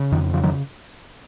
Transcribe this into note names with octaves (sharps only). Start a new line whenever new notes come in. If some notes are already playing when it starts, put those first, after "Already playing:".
Already playing: C#3
F2 D#3
C#3 F3
D#3 F#3